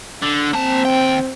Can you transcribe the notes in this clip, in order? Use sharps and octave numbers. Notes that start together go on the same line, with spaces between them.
D3
A#3 C4 A5
D#2 G5